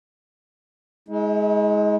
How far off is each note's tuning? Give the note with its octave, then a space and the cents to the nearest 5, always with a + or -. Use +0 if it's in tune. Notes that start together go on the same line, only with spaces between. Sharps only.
G#3 +15 E4 -45